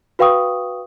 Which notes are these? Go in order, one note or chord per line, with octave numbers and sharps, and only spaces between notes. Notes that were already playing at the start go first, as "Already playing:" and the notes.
F#4 B4 F5 G5 C#6 D#6